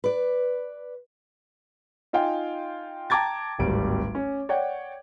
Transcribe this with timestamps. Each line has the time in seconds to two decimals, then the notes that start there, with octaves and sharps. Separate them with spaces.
0.04 B4 D5
2.13 D#4 F4 F5 G5 G#5
3.10 G5 A5 A#5 D6 G#6 A6
3.58 D1 G#1 G3 D7
4.15 C#4
4.49 C#5 D5 F#5 G5